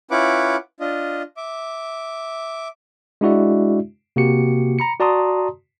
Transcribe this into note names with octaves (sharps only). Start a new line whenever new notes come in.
C#4 E4 F4 B4 F#5 D6
D4 F4 D#5
E5 D6
G#3 D4 E4 F#4 D5 E5
C3 A#3 F#4 G4 C#7
A#5 B5 C#7
F#4 D5 A5 A#5 C6 D#6